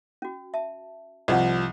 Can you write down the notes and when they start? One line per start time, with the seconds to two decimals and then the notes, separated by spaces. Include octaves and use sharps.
0.22 C#4 F#4
0.54 E5 A5
1.28 C2 F3 D#5 F#5